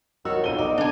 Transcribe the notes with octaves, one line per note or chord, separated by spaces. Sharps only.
D#3 F#4 C#5 E6
B1 F2 D#7 G7
B3 D#4 D5
D3 D4 G#5